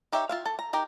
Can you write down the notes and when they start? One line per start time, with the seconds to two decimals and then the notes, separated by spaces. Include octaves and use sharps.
0.12 D#4 G4 C#5 E5
0.29 F4 E5 F5
0.45 A4
0.59 A#5
0.73 D#4 G4 A#4